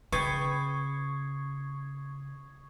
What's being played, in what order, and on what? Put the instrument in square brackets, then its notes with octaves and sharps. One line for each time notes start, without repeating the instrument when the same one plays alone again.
[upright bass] C#3 [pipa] B4 G5 [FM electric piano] C#6 G#6 [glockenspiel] D#6 A6 C7